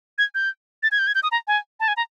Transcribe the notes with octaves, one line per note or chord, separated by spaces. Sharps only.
G#6
G6
A6
G#6
G6
G#6
G6
D#6
A#5
G#5
A5
G#5
A#5